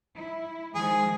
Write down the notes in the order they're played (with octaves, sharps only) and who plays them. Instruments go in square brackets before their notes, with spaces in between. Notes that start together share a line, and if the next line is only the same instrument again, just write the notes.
[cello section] E4
[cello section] D#3 F3 G#3 [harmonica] G#4